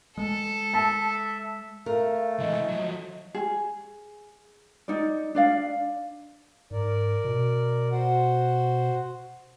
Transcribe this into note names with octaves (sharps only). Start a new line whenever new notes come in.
G#3 A4
E5 A5
A3 A#4 F5
E3 G#3 D#5
F3 F#3
G#4
D#4 D5
D4 D5 F5
G#2 A#4 D5
B2
F#4 C5 F#5